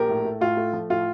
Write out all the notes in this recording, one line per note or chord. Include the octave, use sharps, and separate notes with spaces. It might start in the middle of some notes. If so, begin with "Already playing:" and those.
Already playing: A#1 G4 A#4
A2
A3
A2 F4
A3
F3
A2 F4